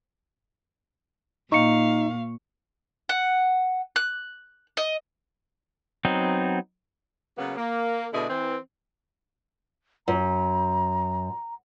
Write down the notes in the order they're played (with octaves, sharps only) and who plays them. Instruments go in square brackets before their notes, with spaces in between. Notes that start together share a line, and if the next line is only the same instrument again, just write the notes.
[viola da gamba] A#2 [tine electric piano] D#4 [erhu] F5 [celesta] C#6 C#7
[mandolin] F#5
F#6
D#5
[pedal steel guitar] F#3 B3 C4 D#4
[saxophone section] C#3 F#3 A#3 B3
A#3
B2 D3 G#3 D4 E4 G#4
E3 C4
[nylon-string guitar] F#2 [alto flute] A#5